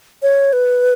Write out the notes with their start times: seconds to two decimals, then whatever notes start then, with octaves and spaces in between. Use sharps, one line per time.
0.22 C#5
0.53 B4